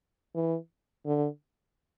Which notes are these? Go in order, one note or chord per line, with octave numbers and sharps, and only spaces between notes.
E3
D3